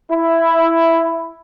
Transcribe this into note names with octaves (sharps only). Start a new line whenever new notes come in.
E4